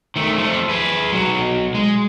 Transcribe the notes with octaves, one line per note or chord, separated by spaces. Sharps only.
D#3 A3
F3 A3
G#4 B4
B1 F#3
G#3